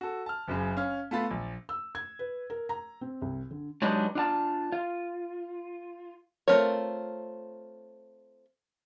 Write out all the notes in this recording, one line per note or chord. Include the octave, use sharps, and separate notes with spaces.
F#4 A4
A5 F6
F#1 F#2 C#3
C#4 F5 F6
A3 B3 F4 B5 A6
A#1
E6
G#6
B4
A#4
A#5
C4
C2
D3
F#3 G#3 D4 D#4 G4 B4
D4 F4 F5 A5
F4
A3 C4 F4 A#4 C#5